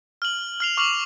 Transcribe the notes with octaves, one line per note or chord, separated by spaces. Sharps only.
F6 F#7
F6 C7 F7
C#6 D6 F6 C7 F7 F#7